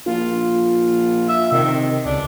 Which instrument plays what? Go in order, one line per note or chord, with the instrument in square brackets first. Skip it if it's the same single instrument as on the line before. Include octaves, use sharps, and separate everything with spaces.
[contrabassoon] A#1 [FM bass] F4
[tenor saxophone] E5
[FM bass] C3 [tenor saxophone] D#3
[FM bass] C#2 [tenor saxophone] D4